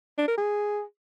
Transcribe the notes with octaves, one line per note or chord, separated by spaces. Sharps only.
D4
A#4
G#4